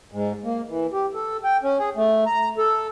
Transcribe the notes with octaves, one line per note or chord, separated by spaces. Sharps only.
G#2
A#3
E3
G4
A4
G5
C#4
G#4
A3
A#5
A4